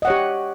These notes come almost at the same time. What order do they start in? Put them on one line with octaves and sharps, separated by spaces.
D#5 F#5 C#5 G4